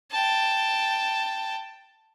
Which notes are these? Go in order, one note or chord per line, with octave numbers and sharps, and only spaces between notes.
G5 A5